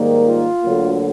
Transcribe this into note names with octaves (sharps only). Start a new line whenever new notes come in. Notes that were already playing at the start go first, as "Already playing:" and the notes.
Already playing: G#2 D#3 G3 A#3
F4
D2 D3 F#3 A#3